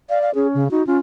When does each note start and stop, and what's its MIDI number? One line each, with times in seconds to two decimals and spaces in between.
0.10 0.34 74
0.10 0.21 77
0.22 0.30 77
0.35 0.64 61
0.35 0.47 68
0.54 0.68 49
0.71 0.85 63
0.71 0.85 66
0.87 0.99 61
0.87 0.97 65